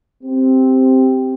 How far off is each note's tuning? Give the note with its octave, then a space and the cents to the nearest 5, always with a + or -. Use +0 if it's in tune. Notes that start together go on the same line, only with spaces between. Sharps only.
C4 +0 G4 +0